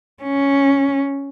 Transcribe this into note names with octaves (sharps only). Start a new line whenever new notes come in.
C#4